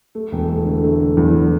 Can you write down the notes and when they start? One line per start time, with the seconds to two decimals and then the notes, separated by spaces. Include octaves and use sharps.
0.15 A3
0.32 E1
0.49 A3
0.66 D3
0.84 A3
1.00 D3
1.17 E2